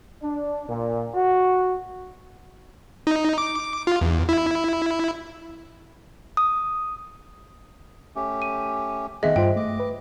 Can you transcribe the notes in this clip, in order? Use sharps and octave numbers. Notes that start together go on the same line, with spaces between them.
D4
A#2
F#4
D#4
D6
F4
E2
E4
D#6
A3 C#4 G4
D#7
D#3 A3 B3 C4 G#4 D#5 E5 F#5
G2 F4 C5 G5
A3 D#5 D6
B4